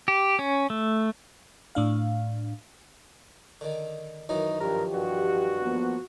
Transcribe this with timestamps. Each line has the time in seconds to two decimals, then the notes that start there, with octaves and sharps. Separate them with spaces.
0.08 G4
0.39 C#4
0.70 A3
1.75 A2 D4 F5
3.61 D3 D#3
4.29 F#2 D#3 E3 D#4
4.60 G2 F3 G4 A#4
4.94 G2 F#4
5.61 F3 A#3 B3